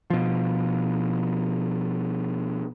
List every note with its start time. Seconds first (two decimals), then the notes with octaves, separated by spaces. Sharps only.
0.10 B2 F3